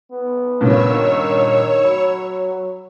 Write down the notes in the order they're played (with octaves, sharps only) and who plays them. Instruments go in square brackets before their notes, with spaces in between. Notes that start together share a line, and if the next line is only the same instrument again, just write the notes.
[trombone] B3
[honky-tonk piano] G2 A#2 C#3 [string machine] C#5 E6
[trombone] D#3
[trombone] F#3 [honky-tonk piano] B5